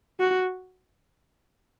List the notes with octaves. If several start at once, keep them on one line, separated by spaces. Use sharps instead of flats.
F#4